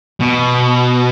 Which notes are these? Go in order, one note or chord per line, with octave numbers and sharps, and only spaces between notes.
B2